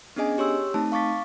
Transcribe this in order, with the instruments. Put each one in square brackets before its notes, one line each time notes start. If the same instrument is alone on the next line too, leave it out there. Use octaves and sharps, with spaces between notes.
[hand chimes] B3 C#4 D4 G#4 D#5 G#5
G4 C#5 C6 E6
A3 C4 D#4 A5
F5 C#6 D6 A6 B6